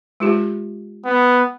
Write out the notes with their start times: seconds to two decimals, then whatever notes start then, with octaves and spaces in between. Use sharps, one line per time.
0.20 G#3 F4 G4
1.05 B3